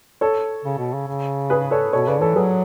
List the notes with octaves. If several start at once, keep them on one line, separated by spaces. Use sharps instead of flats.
A4 C#5
C#3
B2
C#3
C#3
G#4 B4
A4 C#5
B2 A4 C#5
C#3 B4 D5
E3 A4 C#5
F#3 G#4 B4